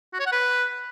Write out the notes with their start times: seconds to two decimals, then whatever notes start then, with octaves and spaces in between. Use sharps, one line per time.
0.13 F#4
0.20 C#5
0.26 F#5
0.32 B4